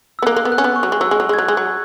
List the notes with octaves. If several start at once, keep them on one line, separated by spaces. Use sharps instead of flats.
E6
B3
A#3 F#6
A#3
B3
F#6
C#4
B3
C#6
F#3
G#3
F#3 E6
G#3
F#3
G#3
G#6
F#3 F#6
G#3
F#3